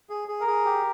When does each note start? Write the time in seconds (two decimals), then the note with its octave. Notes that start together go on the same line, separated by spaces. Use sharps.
0.10 G#4
0.28 G#4
0.41 A#4
0.47 G#4
0.65 G4